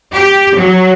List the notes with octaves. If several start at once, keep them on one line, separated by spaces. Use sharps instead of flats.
G4
F#3